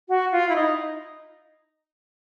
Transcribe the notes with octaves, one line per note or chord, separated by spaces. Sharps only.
F#4
F4
E4
D#4